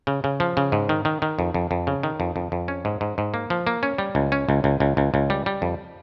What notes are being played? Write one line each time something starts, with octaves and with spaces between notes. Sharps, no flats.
C#3
C#3
F3
C#3
G#2
D#3
D#3
D#3
F2
F2
F2
C#3
D#3
F2
F2
F2
C#4
G#2
G#2
G#2
A#3
F3
A#3
C#4
G3
C#2
C#4
C#2
C#2
C#2
C#2
C#2
G3
G3
F2